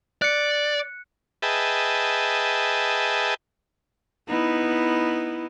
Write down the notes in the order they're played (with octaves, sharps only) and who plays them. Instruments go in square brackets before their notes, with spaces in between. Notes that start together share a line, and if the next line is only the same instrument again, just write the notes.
[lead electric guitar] D5 [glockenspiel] F#6 C#7
[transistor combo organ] G#4 B4 D#5 E5 G5 A5
[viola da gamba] B3 D#4 E4